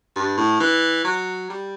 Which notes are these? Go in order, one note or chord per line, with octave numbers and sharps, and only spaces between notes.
G2
A2
E3
F#3
G3